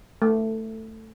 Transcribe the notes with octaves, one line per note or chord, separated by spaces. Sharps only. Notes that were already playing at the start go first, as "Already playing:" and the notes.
A3